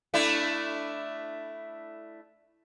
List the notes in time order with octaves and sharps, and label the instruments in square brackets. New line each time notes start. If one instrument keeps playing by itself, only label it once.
[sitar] A3 D4 E4